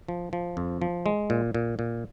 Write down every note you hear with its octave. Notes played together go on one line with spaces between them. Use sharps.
F3
F3
F2
F3
G#3
A#2
A#2
A#2